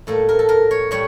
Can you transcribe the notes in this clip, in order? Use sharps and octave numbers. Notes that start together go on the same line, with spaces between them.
A2 G3 A#3 A4
A#4
A4
A#4
C#5
A2 G3 C#5